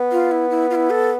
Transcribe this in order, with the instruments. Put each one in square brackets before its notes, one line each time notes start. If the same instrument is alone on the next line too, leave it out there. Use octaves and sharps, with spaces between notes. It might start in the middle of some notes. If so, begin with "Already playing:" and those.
Already playing: [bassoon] B3
[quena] F4
E4
E4
F4
E4
A4